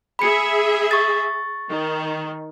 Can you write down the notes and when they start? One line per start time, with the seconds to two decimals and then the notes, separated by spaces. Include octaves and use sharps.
0.19 G#4 E5 B5 C#7
0.91 C#6 A6
1.68 D#3